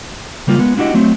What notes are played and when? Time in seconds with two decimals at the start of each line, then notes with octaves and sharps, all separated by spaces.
0.47 C#3 G3 A#3 F4
0.59 G#3 B3
0.77 D4 E4 F#4 G4 D#5
0.94 F#3 A3 C4